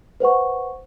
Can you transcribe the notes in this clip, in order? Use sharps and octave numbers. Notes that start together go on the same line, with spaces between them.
B4 C5 F#5 C#6